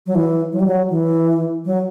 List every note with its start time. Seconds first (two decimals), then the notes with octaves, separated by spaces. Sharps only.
0.06 F#3
0.15 E3
0.52 F#3
0.60 G3
0.66 F#3
0.90 E3
1.65 F#3